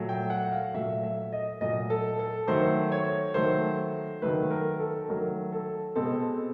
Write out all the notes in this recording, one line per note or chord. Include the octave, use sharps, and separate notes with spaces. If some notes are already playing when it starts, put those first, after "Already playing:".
Already playing: A#2 F#3 A3
G5
F#5
F5
A#2 F#3 A3 E5
E5
D#5
A#2 F#3 A3 D#5
A4
A4
D#3 F#3 A3 C5
C#5
D#3 F#3 A3 C5
D#3 F#3 A3 B4
A#4
A4
D#3 F#3 A3 A#4
A4
B2 G#3 C4 A4